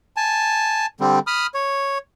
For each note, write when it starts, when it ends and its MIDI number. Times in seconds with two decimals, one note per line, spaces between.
0.17 0.86 80
0.17 0.86 81
1.00 1.19 50
1.00 1.19 55
1.00 1.19 60
1.27 1.47 83
1.27 1.47 87
1.27 1.47 89
1.54 1.98 73